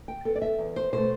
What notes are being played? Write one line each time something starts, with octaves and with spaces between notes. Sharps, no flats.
G5
B3 A4
D5
E5
E2
C5
B2 A3 C5